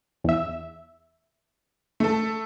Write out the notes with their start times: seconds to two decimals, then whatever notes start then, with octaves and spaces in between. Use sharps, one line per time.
0.24 E2 E5
2.00 A3 A4